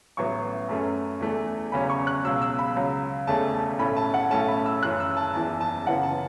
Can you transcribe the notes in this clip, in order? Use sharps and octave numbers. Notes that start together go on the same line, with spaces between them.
A1 A2 F#3 B3 C#6
F#2 F#3 A3 C#4
E2 E3 A3
E1 E2 C#3 F#3 C#4 B5
C#6
F#6
C#2 B2 F#3 E6
E6
B5
C#2 C#3 F#3
E1 E2 C#3 A3 C#4 A5
A5
B1 A2 A3 C#4 B5
A5
F#5
B1 A2 A3 C#4 A5
B5
E6
F#2 E3 C#4 F#6
E6
A5
F#1 E2 E3 A5
A5
F#2 C#3 E3 B3 F#5
A5